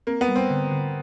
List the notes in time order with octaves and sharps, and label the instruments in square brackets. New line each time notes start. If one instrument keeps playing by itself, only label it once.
[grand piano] A#3 [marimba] C4
[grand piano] B3
[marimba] G3
[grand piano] C4
[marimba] D3
D3